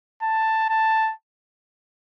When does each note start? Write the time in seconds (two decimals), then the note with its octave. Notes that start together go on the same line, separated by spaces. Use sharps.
0.22 A5
0.70 A5